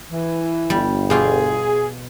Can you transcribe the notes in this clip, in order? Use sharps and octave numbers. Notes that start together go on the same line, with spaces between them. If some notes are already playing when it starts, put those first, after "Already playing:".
E3
G1 G3
B2 F4 G4 G#4